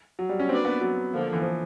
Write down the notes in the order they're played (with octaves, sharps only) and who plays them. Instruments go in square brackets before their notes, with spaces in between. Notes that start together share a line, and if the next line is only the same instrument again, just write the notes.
[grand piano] F#3
G3
C#4
[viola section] A#3 D4 F#4 B4 D5 [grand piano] C4
[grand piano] B3
F#3
[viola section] D3 F3 A#3
[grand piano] E3
F3